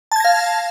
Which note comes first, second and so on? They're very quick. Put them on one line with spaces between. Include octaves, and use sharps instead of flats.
A5 G#6 A#6 F5